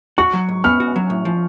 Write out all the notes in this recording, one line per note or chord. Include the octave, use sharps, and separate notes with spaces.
F#4 C#6
F#3
G#2
B3 F6
F#4
F#3
A2
F3